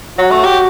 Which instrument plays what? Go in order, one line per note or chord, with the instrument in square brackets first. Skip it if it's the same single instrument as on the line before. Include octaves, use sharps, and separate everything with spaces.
[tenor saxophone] F#3 [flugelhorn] F#4
[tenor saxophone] A3
G4